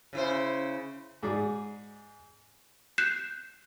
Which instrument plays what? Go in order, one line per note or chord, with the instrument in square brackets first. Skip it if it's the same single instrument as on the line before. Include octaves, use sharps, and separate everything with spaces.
[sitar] C#3 E4 C5
[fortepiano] G#2 G#4 D5
[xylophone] F#6 G6 C7 E7